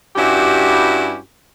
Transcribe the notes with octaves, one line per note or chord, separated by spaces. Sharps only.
G2 C#4 E4 F#4 G4